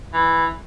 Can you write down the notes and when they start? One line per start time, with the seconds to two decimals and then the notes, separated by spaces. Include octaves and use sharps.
0.14 E3